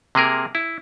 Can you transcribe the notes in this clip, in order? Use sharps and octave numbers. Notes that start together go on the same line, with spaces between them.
C3 A#3 G#4 A#4
E4